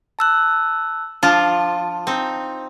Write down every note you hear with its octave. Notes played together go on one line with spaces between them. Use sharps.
A5 E6 F#6
F3 D4 F4 A5
C4 D#4